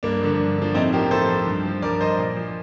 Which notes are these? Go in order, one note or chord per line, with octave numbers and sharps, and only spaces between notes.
G2 A#3 D4
D3 F3
G2
D3 F3
A2 C4 D#4
F3 G4 A#4
A2 A4 C5
F3
G2
F3
G2 A#4 D5
F3 C5 D#5
A#2
F3